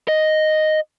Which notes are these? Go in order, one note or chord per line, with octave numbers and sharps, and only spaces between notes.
D#5